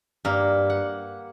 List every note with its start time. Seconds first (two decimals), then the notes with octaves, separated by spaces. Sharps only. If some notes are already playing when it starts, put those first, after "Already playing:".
0.25 G2 A#3 A#5
0.70 F#5